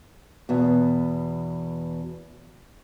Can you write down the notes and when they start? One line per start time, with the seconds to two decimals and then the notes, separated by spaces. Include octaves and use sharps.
0.49 E2 B2